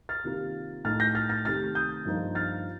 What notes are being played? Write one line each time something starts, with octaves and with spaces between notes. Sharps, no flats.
F6 A6
C3 D#3 A#3 F4
A2 A3 D#4 F6 A6
G6 A#6
F6 A6
F6 A6
C3 D#3 A3 F6 A6
D#6 G6
G2 F3 A#3 D#4
F6 A6